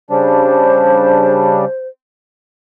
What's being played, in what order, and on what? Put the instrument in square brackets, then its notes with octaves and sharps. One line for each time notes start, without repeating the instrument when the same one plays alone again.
[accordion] C#3 G3 D4 [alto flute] C5